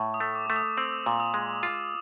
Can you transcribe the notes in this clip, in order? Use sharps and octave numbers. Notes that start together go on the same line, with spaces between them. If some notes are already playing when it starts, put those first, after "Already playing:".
Already playing: A2
D#6
A3
D6
A3
D#6
C4 E6
A#2
D#6
G#3
F4 D6